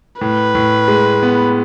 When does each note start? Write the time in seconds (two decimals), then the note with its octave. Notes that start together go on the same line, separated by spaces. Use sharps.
0.21 A2 B4
0.55 A2
0.88 G#3
1.23 B3